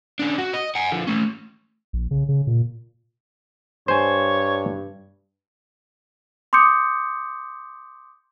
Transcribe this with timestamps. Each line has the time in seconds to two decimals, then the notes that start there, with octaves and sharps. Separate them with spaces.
0.19 C#3 D4
0.38 F#4
0.53 D#5
0.75 F#5 G#5
0.92 D3 F3
1.07 A3 C#4
1.93 A#1
2.11 C#3
2.29 C#3
2.47 A#2
3.88 G2 C5 C#5 G#5
6.53 C6 D6 D#6 G6 C#7